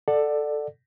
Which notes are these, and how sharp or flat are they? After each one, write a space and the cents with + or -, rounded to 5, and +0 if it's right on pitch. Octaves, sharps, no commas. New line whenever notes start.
A4 +0 D5 +15 F#5 +0